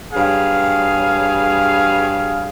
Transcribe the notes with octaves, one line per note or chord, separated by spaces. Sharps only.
G2 F#3 G#4 F5